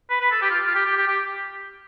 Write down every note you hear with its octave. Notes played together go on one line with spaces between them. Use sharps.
B4
B4
A4
G4
F4
F4
G4
G4
G4
G4